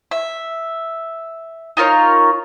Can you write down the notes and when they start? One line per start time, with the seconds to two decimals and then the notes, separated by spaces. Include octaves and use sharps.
0.11 E5
1.77 D#4 F4 A#4 C#5